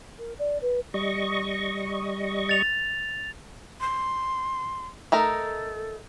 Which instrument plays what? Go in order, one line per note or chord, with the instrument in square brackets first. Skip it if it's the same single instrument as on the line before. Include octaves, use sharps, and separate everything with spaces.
[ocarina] A#4
D5
B4
[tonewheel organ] G3 D#5 C#6
[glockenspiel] A6 F7
[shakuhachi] C6
[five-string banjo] A3 D#4 A#4 [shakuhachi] A4